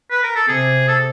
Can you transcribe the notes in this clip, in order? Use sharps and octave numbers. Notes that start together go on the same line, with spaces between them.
B4
A#4
A4
C3 G#4
A4